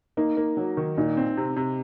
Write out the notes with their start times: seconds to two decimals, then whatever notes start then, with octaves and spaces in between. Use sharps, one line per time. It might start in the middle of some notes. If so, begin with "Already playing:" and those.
0.17 A#3 D#4
0.37 A#3
0.57 F#3
0.77 D#3
0.97 A#2 D#4
1.17 C4
1.37 C3
1.57 C3